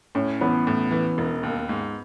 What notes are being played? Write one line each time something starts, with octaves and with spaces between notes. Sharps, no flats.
A2 C#4
E3 B3
A2
E3
E1
D#2
G#2